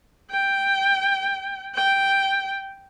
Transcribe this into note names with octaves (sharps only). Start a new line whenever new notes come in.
G5
G5